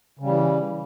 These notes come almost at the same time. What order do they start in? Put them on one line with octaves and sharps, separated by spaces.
C#3 G3 E3